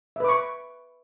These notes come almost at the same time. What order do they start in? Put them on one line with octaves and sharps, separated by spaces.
E5 B4 D6 C#6